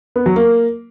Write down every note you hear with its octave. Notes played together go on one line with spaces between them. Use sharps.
B3
F#3
A#3